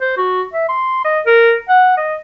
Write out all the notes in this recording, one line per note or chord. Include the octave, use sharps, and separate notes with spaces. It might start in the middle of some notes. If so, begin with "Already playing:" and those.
C5
F#4
E5
C6
D#5
A#4
F#5
D#5